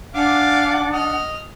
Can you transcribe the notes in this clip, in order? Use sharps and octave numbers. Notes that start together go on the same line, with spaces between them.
D4 F5 F#5 G#5 D6
D#5 D#6 F6